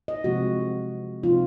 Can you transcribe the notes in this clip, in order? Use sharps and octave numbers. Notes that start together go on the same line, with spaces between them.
D#5
C3 F3 G#3 C4 F#4
C3 F3 C4 D#4 F4